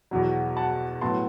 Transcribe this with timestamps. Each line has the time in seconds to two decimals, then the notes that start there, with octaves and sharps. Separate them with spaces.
0.11 E2 B2 F#3
0.57 F#5 A5
1.01 A2 F#3 B3 A5 C6